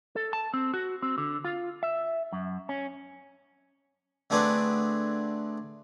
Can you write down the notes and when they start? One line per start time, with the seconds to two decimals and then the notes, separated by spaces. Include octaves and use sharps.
0.16 A4
0.33 A5
0.54 C4
0.74 F#4
1.02 C4
1.18 D3
1.45 F4
1.83 E5
2.32 F#2
2.69 C#4
4.30 D3 A3 C4 D4 G#4 B4